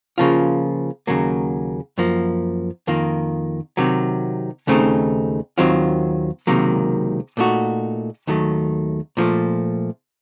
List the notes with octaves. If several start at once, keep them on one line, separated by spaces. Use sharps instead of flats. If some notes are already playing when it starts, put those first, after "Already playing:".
C#3 F3 A#3 F4
D#2 C#3 F#3 A#3
F#2 F3 A#3
F2 D#3 A#3 F4
C3 D#3 F#3
D#2 C#3 A3 C4 D#4
D#2 D#3 F#3 C4 F4
C#2 C3 D#3 F#3 A#3
A#2 A3 D#4 F#4
D#2 D#3 F#3 A3
A#2 F3 A3